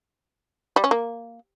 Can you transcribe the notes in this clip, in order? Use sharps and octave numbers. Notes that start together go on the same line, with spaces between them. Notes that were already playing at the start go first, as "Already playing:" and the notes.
G3
C#4
A#3